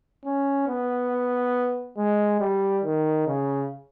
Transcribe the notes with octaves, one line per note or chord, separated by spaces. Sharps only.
C#4
B3
G#3
G3
D#3
C#3